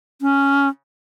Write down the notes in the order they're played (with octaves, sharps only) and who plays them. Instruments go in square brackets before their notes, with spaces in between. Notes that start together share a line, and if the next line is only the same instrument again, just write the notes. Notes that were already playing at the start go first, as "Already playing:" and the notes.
[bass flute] C#4